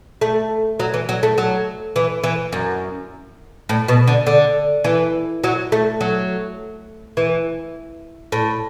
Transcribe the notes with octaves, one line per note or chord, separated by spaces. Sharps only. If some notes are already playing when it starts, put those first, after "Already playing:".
A3
F#3
E3
F#3
A3
F#3
E3
E3
F#2
A2
B2
D3
D3
E3
F#3
A3
F#3
E3
A2